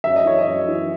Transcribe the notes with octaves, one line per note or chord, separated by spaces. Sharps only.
F#2 E5
D#5
E3 C#5
D#5
F#2
E3